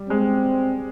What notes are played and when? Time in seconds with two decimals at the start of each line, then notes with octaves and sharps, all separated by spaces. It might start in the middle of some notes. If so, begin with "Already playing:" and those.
Already playing: G3
0.10 G#3 C4